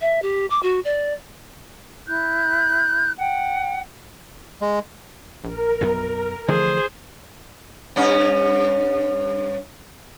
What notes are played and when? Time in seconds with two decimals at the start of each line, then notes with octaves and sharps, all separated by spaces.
0.01 E5
0.22 G4
0.50 D6
0.63 F#4
0.85 D5
2.07 E4 F#6 G6
3.18 F#5 G5
4.61 G#3
5.44 A#1 A#4
5.81 B1 F#2 B3
6.48 D3 E3 F3 A3 G#4 C5
7.96 G2 C#4